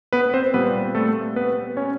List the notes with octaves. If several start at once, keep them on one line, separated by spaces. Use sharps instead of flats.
B3 B4
C4 C5
A#2 G3 B3 C4 B4
A3 A4
B3 B4
C#4 C#5